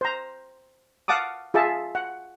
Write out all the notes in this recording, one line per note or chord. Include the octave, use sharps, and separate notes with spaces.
C5 A#5
F5 F#5 A5 D6 D#6
F4 G#4 E5 A5
F#5